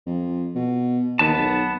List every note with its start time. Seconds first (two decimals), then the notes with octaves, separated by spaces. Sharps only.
0.06 F2
0.55 B2
1.19 D#2 B3 B4 A5
1.37 B1